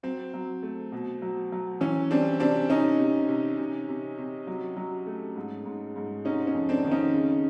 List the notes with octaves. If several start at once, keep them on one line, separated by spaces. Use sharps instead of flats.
F#3 C4
F#3
A3
B2
F#3
F#3
E3 C#4
G3 C4 D4
C3 C4 D4
C3 C#4 D#4
C3
C3
C3
C3
C3
F#3
F#3
A3
G#2
G#2
G#2
C3 C#4 D#4
C#4
F2
C4 D4
D#3
C#4 D#4
C#3